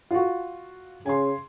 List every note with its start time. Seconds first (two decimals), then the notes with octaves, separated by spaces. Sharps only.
0.11 F4 F#4
1.06 C#3 G#5 C6